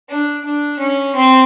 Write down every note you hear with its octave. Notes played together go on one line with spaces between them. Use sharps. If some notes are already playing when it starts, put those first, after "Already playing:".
D4
D4
C#4
C4